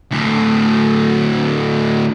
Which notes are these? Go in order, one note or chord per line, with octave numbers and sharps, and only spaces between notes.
D2 A2